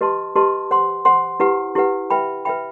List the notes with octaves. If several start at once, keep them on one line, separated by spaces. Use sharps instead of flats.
G4 B4 D#5 A5 C6
G4 B4 D#5 A5 C6
C5 F#5 C6
C5 F#5 C6
E4 G4 B4 F#5
E4 G4 B4 F#5
B4 E5 G5 B5
B4 E5 G5 B5